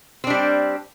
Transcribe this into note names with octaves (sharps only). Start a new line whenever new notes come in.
G3 C4 D4